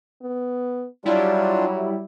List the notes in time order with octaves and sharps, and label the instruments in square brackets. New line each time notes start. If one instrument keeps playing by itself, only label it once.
[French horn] B3
[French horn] F#3 [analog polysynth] G3 E4 [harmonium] D4 F4